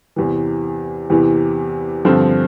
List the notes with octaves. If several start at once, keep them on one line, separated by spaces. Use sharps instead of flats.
E2 C3 E3
E2 C3 E3
G2 D3 F3 C4